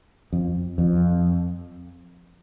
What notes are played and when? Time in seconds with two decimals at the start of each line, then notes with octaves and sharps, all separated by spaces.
0.33 F2
0.78 F2